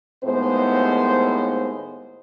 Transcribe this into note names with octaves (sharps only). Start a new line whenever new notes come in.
D#2 A2 G#3 B3 C5